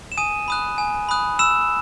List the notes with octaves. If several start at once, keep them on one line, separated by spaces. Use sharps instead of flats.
E7
G#5 D#6 D#7
B5 D#6 F#6
G#5
B5 D#6 F#6
B5 E6 E7